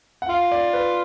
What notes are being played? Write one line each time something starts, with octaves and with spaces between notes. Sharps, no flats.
F#5
F4 F5
D5
B4